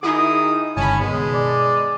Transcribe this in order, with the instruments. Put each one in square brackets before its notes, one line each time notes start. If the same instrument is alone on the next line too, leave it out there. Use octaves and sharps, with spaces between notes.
[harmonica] D#3 D#6 [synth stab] D#4 E4 G#4 [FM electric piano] F#4
[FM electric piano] G1 C#2 D#6 [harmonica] C#4 G#5 [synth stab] A5 B5
[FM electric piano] B2 D#3 B3 [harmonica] G#3
[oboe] D5